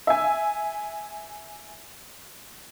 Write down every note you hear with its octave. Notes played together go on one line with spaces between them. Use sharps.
E5 G#5